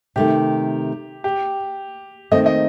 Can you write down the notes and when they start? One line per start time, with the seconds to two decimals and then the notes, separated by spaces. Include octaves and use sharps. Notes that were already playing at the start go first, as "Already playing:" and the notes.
0.16 C3 D#3 A3 G4
1.24 G4
2.31 D#3 A3 C4 D#5
2.46 D#5